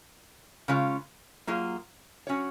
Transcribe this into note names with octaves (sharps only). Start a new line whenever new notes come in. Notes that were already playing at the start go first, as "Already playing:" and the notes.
C#3 G#3 C#4 F4
F#3 A#3 F4 G#4
F#3 C#4 F#4 C#5